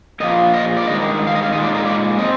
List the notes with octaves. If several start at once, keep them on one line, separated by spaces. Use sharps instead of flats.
A#2 F3 A#3 D#5
D#5
D5
G2 D#3 G#3 D#5
F5
D#5
F5
A#2 G#3 D#4 D#5
D5
A#4
D5
F3 C4 D#5